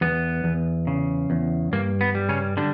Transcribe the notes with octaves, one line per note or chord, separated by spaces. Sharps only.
E2 B3
E2
C#3
E2
G2 A#3
B3
G3
C#3 C#4
D3 G3 D4